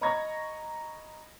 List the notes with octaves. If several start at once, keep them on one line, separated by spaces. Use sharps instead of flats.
D#5 A#5 B5 C#6 G#6 A#6